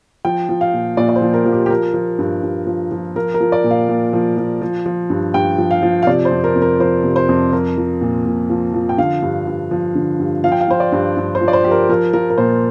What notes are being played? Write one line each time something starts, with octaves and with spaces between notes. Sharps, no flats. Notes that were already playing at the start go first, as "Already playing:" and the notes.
F3 G5
F3
F5
A#2
A#2 D5
D5
C5
F3
A#4
F3
G4
G4
F3 A#4
F3
G2
G2
F3
F3
F3 A#4
A#4
F3
D5
A#2
F5
A#2
F3
F3
F3
F3
G2
G2 G5
F3
F5
F3
F5
C3 D5
C5
F2
A#4
F2
A#4
F3 C5
C3
C5
F2
F3 A#4
F3
A#2
A#2
F3
F3
G5
D3 F5
G2
G2
F3
D3
G2
F3 F5
G5
F5
F3 C5
D5
G2
G2
C5
F3
D5
C5
F3 G4
A#4
F3 A#4
F3 A#4
A#4
A#2 C5